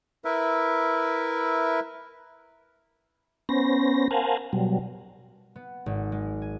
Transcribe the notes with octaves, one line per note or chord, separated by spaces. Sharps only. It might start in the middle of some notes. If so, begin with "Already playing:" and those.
E4 A#4 B4 E5
B3 C#4 C5 A#6
A#4 C5 F5 F#5 G#5 A5
B2 F#3 G3
B3
G#1
G#3
G#5